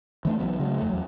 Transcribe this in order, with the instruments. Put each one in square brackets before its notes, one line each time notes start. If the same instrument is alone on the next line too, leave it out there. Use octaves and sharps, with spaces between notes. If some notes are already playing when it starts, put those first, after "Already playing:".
[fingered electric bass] E3 A3 D4
B1 E3 F#3 B3
C#3 F#3 G#3 A3
F2 A3
E2 F#3